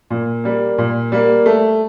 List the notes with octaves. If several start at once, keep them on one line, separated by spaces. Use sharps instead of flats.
A#2
G3 A#3
A#2
G3 A#3
A3